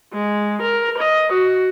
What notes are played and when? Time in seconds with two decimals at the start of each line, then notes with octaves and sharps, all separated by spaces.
0.14 G#3
0.62 A#4
0.98 D#5
1.32 F#4